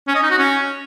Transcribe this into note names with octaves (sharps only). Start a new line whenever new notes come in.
C#4
D#5
D#4
F#4
C#4